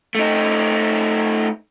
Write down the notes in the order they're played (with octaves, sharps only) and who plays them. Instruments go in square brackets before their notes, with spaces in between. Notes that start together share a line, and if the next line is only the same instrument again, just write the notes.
[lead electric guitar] A3 D#4